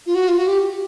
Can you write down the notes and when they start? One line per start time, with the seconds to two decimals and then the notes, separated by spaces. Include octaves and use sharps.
0.06 F4
0.15 F#4
0.28 F4
0.38 F#4
0.48 G4